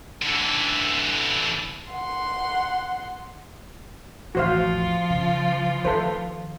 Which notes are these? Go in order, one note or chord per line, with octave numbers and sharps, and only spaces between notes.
D3 E3
F#5 C6
A1 D#2 F3 F4 F#4 C5 F5
C#3
D#3 A4 B4 C5